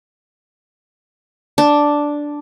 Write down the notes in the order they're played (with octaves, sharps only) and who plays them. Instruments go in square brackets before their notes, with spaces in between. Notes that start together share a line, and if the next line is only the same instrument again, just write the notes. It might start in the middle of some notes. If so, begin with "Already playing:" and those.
[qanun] D4